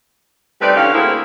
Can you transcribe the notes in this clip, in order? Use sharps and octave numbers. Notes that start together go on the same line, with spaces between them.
G3 A3 C4 D#4 B4 D5
D3 E3 C#4 E4 G4 F5
D2 A#3 C4 E4 G#4